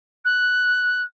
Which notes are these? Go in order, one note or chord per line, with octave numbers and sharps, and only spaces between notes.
F#6